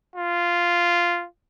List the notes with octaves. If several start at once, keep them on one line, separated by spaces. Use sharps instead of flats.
F4